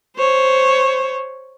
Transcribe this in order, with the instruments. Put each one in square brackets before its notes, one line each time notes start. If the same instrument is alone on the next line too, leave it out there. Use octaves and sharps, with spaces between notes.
[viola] C5 C#5